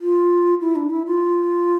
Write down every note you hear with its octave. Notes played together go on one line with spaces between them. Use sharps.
F4
E4
D4
E4
F4